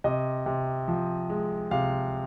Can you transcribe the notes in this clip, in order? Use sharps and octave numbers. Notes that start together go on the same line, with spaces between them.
C3 D#5
C3
F3
G#3
C3 F5